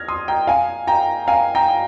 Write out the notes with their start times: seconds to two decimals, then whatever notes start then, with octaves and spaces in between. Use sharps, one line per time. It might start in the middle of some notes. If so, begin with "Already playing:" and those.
Already playing: F6 G#6 A#6
0.08 C6 D#6
0.28 G5 A#5
0.47 F5 G#5
0.87 G5 A#5
1.28 F5 G#5
1.55 G5 A#5